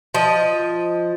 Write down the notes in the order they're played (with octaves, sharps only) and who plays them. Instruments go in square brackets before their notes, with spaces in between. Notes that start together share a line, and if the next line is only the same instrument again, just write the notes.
[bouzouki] F3 D#5